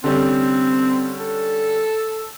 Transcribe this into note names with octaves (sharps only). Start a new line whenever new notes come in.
D3 G3 C4 C#4
A4